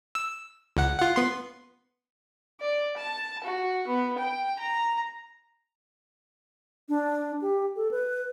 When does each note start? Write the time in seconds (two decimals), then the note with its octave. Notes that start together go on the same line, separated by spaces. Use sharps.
0.15 E6
0.77 C#2 F#5
0.98 F4 F#5
1.16 B3 C6
2.60 D5
2.97 A5
3.44 F#4
3.88 B3
4.18 G5
4.59 A#5
6.89 D4
7.42 G4
7.76 A4
7.91 B4